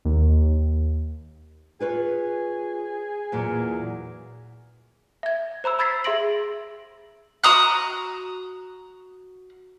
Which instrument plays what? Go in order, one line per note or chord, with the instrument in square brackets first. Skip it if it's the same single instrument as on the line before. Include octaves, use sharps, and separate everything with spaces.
[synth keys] D#2
[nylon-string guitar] F4 B4 C#5 [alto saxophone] G#4
[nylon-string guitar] E2 A#2 F#3
[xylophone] E5 G#6
C5 A#5 B5 E6
B5 E6 G#6 A6 B6 C7
G#4 E5 C6 A#6 D7 F#7
[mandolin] F#4 A#5 D#6 F#6